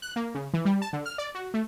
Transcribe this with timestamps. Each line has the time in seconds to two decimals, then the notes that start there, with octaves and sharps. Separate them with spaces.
0.02 F#6
0.16 A#3
0.35 C#3
0.54 E3
0.65 G3
0.82 A5
0.93 D3
1.06 F6
1.18 D5
1.35 F#4
1.54 A3